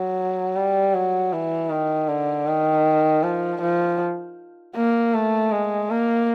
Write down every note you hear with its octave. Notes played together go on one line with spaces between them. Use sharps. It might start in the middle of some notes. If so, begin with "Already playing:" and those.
Already playing: F#3
G3
F#3
E3
D#3
D3
D#3
F3
F3
A#3
A3
G#3
A#3